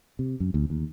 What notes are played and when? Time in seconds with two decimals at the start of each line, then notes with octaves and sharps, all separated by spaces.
0.19 C3
0.40 F#2
0.54 D2
0.70 D#2